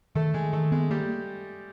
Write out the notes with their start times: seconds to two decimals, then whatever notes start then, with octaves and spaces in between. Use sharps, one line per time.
0.15 D#3 A3 A4
0.34 D#3 G#3 G#4
0.53 D#3 A3 A4
0.71 G#3 B3 G#4
0.90 G3 A#3 G4